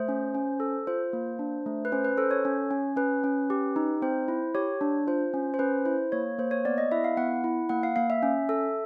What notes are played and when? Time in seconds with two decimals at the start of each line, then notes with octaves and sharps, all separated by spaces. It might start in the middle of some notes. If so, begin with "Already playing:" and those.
Already playing: A3 C5
0.08 C#4
0.35 C#4
0.60 A4
0.87 F4 C5
1.13 A#3
1.39 D4
1.66 A3
1.85 B4
1.92 C#4 C5
2.05 B4
2.17 A4 C5
2.31 C#5
2.45 C#4
2.71 C#4
2.96 C#4 B4
3.24 C#4
3.50 G4
3.76 D#4
4.02 C4 C5
4.28 E4
4.55 G4 C#5
4.81 D4
5.07 F4 C5
5.34 C#4
5.54 C5
5.59 C#4 B4
5.85 E4 C5
6.12 A#3 C#5
6.38 A#3 C5
6.51 C#5
6.65 B3 D5
6.78 D#5
6.92 E4 E5
7.04 F5
7.17 B3 F#5
7.44 E4
7.69 A#3 F#5
7.83 F5
7.96 A#3 F5
8.10 E5
8.23 C#4
8.49 A4